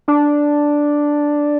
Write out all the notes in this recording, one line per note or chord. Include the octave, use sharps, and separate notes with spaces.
D4